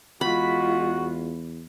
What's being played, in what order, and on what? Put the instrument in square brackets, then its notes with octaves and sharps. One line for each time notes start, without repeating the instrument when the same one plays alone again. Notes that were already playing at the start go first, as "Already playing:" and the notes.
[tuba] E2 [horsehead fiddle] G#3 F4 [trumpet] F#4 [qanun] B5